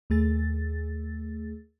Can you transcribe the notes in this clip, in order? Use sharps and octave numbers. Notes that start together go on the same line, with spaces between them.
D#2 A3 G#4 A6